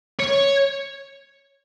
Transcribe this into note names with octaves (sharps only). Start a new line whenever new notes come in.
C#5